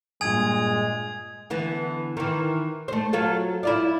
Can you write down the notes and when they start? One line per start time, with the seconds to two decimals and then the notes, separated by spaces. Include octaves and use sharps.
0.21 G2 A#2 G#3 G#5 D#6 G#6
1.50 D3 E3 B3
2.17 D#3 E3
2.88 A3 C5
3.13 F#3 F4 A4
3.63 E4 F4 D5